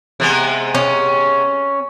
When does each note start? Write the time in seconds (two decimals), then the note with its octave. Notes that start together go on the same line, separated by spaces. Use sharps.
0.20 C3 G#3 B3
0.75 C#4